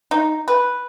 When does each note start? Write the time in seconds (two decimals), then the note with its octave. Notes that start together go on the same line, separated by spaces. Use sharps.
0.11 D#4
0.48 B4